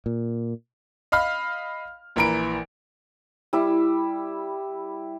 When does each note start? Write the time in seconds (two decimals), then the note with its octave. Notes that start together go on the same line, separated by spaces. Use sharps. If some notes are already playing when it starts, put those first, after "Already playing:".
0.06 A#2
1.12 D#5 F5 B5 F6
2.16 A#1 E3 A#4 B5 D7
3.53 G3 E4 E5